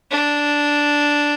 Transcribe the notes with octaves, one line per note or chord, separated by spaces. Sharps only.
D4